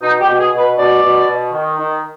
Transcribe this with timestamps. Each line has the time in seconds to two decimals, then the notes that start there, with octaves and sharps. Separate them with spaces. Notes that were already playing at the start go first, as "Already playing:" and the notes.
0.02 B2 D#4
0.21 G4
0.27 B2
0.40 G#4
0.52 B2
0.58 B4
0.77 B2 D5
1.02 B2
1.27 B2
1.52 D#3
1.77 D#3